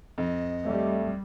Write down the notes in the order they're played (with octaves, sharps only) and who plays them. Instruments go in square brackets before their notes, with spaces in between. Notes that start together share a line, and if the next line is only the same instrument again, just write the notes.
[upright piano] F2 [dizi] D#5
[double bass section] G3 [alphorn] A3